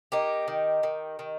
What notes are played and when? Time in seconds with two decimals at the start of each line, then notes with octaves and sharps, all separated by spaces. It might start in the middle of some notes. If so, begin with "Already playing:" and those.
0.12 A#3 D#4 G4
0.48 D#3
0.83 D#3
1.19 D#3